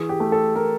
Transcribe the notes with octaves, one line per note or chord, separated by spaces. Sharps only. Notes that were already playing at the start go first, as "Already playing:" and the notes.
Already playing: E3 G#4
G4
A3
A4
A3 A#4